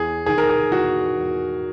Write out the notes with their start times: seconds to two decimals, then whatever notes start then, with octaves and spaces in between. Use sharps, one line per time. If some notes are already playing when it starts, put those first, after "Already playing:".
Already playing: E2 G#4
0.26 D#3 G#4
0.38 A#4
0.49 G#4
0.72 E2 F#4
1.18 E2